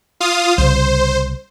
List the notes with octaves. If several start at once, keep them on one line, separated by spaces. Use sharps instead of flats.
F4 F5 D#6
C2 C#3 G3 C5